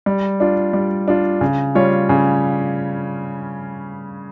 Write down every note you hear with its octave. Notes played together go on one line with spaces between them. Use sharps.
G3
D4 F4
G3
D4 F4
C#3
G3 C#4 F4 C#5
C#3